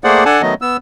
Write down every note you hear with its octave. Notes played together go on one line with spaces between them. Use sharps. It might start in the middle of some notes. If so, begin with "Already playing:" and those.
A3 A#3 G#4 C5 D5 F#5
D4 A4 F#5 G#5 A5
D#3 F#3 A3 B3 D#5
B3 E6